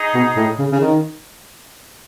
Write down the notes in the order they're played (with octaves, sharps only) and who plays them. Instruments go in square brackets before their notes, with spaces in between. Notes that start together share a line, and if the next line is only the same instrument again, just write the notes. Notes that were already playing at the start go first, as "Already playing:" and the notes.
Already playing: [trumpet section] D#4 G#4 D#5
[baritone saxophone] B2
A2
C#3
C#3
D#3